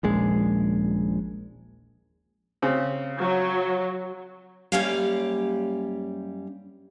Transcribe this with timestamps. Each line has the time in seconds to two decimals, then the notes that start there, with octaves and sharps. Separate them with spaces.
0.03 D#1 A#1 G#3
2.62 C#3 C4
3.19 F#3
4.72 F#2 G3 A#3 C#4 G4 F5